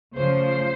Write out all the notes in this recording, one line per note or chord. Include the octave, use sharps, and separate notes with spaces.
C#3 F3 A3 C5